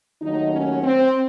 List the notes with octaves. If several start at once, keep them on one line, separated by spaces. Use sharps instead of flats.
D#2 D#3 F#3 A3 D#4
C#4
C4